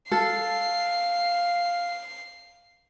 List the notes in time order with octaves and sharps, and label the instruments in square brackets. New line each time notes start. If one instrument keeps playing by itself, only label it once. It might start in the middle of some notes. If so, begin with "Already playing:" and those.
[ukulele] A4 [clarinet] F5 [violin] C7